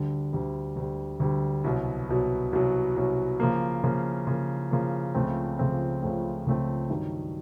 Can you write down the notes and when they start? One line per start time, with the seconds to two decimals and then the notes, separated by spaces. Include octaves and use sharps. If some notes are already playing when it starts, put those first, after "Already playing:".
Already playing: D2 D3 G3
0.33 D2 D3 G3
0.76 D2 D3 G3
1.20 D2 D3 G3
1.64 C2 B2 F#3
2.09 C2 B2 F#3
2.52 C2 B2 F#3
2.96 C2 B2 F#3
3.40 C#3 F3 A#3
3.83 C#3 F3 A#3
4.27 C#3 F3 A#3
4.71 C#3 F3 A#3
5.15 C#2 C#3 F3 A3 C4
5.59 C#2 C#3 F3 A3 C4
6.03 C#2 C#3 F3 A3 C4
6.46 C#2 C#3 F3 A3 C4
6.90 G2 D#3 F#3